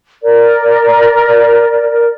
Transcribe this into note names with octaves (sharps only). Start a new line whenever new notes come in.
A#4 D5